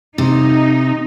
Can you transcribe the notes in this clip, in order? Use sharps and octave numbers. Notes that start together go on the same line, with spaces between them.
C3 D#4